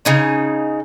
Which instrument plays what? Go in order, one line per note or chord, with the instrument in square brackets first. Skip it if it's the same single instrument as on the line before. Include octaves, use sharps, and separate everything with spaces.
[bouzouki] C#3 D#4 G#5